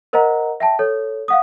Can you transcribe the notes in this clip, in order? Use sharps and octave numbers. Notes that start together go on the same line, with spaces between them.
A#4 C5 D#5 F#5 A#5
E5 G5 A5
A4 C#5
F5 F#5 D#6